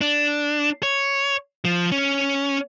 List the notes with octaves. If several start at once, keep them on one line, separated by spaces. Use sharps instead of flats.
D4
C#5
F3
C#4